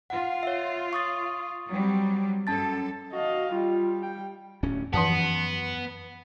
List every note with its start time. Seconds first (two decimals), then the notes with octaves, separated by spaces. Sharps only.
0.10 F4 F#5
0.43 C#5 E5
0.93 C#6 D#6 A6
1.68 F#3 G3 C4
2.47 F#2 C#4 A4 A5 A6
3.13 F#4 D#5 F5
3.52 G3 F4
4.02 G5
4.63 D1 D2 C#4
4.93 F#2 E3 F3 B3 A5